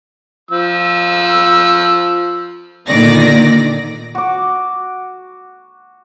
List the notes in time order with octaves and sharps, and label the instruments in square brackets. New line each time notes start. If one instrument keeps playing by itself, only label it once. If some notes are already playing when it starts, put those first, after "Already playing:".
[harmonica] F3 E6
[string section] A#2 D3 D#3 B3 D5 A#6
[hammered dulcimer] F#4 D6